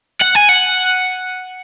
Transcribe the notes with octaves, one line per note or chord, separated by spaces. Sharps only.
F#5
G#5
F#5